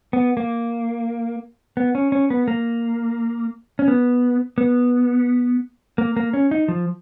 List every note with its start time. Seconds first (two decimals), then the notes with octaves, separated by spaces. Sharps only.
0.13 B3
0.37 A#3
1.77 B3
1.95 C#4
2.12 C#4
2.30 B3
2.48 A#3
3.79 C#4
3.88 B3
4.58 B3
5.98 A#3
6.16 A#3
6.33 C#4
6.51 D#4
6.68 F3